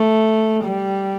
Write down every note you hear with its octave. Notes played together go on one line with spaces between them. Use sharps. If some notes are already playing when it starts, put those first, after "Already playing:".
Already playing: A3
G3